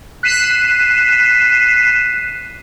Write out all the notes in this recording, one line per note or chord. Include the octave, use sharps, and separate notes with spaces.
F#6 B6 C7 D#7 E7